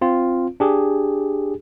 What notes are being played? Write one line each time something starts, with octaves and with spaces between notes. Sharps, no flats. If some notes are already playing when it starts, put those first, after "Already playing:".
C4 F4
D4 G4 G#4